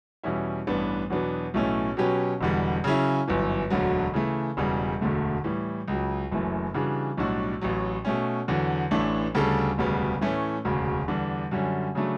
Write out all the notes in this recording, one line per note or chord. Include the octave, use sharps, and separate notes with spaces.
E2 B2 G3 C#4 E4
A1 G2 E3 B3 D4
E2 B2 F#3 B3 D4
B1 A2 E3 A3 C#4
B2 F#3 C#4 G4 B4
E1 E2 D3 G3
C#3 F#3 C#4 E4
G1 F#2 E3
E1 D2 D3 F#3
C#3 E3 A3
E1 E2 C#3 G3
E1 D2 D3 A3
A2 E3 G3
C#2 C#3 F#3
F#1 F#2 E3 A3
C#3 E3 G3 D4 F#4
B1 A2 G3 D4 F#4
A1 A2 F#3
B2 A3 C#4
E2 D3 F#3
A1 A2 E3 A3 D4
D2 C#3 G3 D4 A4
E1 D2 C#3 G3 B3
A2 E3 A3 C#4
E1 D2 C#3
E2 D3 G3 D4
F#2 D3 G3 C#4
C#3 F#3 A3 D4